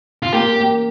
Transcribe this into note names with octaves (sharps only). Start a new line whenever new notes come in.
F4
A#3 G4
A#3